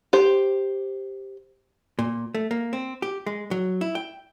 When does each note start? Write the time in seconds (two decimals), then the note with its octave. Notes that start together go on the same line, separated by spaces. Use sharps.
0.13 G4 C5
1.99 A#2
2.35 A3
2.51 A#3
2.73 C4
3.02 G4
3.26 G#3
3.51 F#3
3.81 E4
3.95 G5